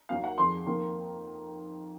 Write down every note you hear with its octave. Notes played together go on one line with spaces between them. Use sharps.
D#2 D#3 F#3 A#3 F5
F#5
F2 D#3 G#3 C6
F2 D#3 A#3